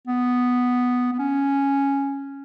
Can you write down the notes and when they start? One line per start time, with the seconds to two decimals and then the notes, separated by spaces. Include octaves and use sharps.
0.07 B3
1.13 B3
1.19 C#4